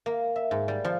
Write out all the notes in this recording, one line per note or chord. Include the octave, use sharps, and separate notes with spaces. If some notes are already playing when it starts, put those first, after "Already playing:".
A#3
E5
G#2
G3
F3